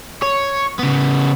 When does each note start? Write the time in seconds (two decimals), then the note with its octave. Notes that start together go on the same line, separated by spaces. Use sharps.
0.23 C#5
0.79 C#3 B3